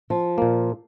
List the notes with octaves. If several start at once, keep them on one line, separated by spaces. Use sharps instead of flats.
F3
A#2 A#3